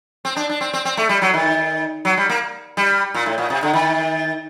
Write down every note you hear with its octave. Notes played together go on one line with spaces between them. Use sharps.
C4
D4
D4
C4
C4
C4
A3
G3
F#3
D#3
F#3
G3
A#3
G3
A#2
A2
A#2
C3
D3
D#3